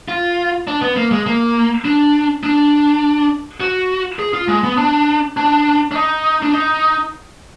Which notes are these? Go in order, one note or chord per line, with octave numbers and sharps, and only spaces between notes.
F4
D4
B3
A#3
G#3
A#3
D4
D4
F#4
G#4
F4
G#3
B3
D4
D4
D4
D#4
D4
D#4